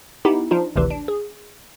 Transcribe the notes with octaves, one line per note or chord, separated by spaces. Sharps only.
B3 D#4 E4 G4
F3 D4 D#4 F4
G#1 D2 C3 E3
D4
G#4